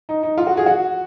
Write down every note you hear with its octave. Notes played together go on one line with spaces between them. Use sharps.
D#4
D#4
F4
F#4
G#4
F#4